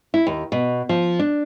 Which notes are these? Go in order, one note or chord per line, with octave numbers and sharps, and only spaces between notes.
E4
D#2
B2
F3
D4